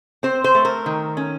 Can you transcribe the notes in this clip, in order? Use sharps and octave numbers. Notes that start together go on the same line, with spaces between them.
C4 C5
C5
A3
A#4
D#3
C#4